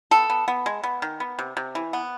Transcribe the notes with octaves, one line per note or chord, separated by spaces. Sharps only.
B3 A4
B3
B3
G#3
B3
D#3
B3
C3
C3
E3
B3